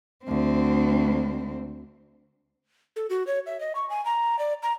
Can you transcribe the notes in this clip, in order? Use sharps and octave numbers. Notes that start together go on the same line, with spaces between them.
D2 C4
A4
F#4
C#5
E5
D#5
C#6
G#5
A#5
D5
A#5